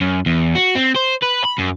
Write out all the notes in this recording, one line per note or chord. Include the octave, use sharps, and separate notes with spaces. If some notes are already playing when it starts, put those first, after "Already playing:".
F#2
E2
F#4
C4
C5
B4
B5
F#2